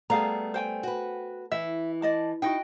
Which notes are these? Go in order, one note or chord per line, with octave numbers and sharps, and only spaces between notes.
G3 A3 B3 G#4 F5 A#5
C5 G5 G#5
F#4 B4
E3 E5
D5 D#5 A5
D#4 E4 F#4 D#5 G5